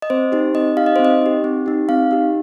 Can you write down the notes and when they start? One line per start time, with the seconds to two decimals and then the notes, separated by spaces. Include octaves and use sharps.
0.02 D#5
0.10 C4 C5
0.32 D#4 G4 C5
0.55 C4 D#5
0.77 D#4 G4 F5
0.86 D#5
0.96 C4 C5
1.05 D#5
1.21 D#4 G4
1.44 C4
1.66 D#4 G4
1.89 C4 F5
2.11 D#4 G4